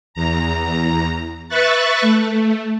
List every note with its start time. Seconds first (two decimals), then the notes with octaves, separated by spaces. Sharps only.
0.14 E2 A#5
1.49 B4 E5 C#6 F#6 A6
2.02 A3